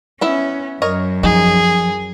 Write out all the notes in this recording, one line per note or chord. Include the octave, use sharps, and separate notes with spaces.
B3 C#4 E4 E5
F#2 A#4 C#5 D#5
F3 D#4 G#4